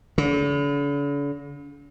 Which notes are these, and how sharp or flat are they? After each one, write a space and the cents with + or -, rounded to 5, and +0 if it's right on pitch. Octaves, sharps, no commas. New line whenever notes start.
D3 -45